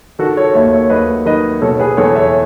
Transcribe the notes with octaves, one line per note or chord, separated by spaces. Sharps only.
D#3 F#4 A4
A4 C#5
D#2 C#5 E5
C#5 E5
D#2 B4 D#5
D#3 B4 D#5
B2 A4 C#5
G#4 B4
E2 A4 C#5
C#5 E5